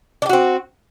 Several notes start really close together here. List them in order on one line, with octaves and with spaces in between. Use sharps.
D4 G4 F#4 C4